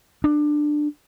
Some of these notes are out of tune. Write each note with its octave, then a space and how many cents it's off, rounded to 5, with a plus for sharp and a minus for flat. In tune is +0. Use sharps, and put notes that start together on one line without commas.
D4 +15